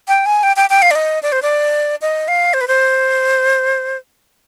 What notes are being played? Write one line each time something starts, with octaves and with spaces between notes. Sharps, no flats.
G5
G#5
G5
G5
G5
F5
D5
D#5
D5
C5
D5
D#5
F5
C5
B4
C5